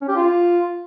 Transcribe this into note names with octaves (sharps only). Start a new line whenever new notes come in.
C#4
G4
F4